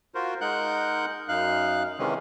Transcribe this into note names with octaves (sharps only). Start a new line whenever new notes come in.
F4 F#4 A#4 C5
G#3 D#4 A#4 F#5 F#6 G6
F#2 D#4 F5 F#6
C3 D#3 E3 G#3 C#4